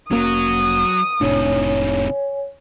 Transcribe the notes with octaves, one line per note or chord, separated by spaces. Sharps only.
F1 F#3 A#3 C#4 D#6
F1 A2 C3 D#3 D4 C#5 G#5